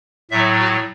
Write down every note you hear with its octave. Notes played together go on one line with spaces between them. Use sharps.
A2 F#3 E5
F#4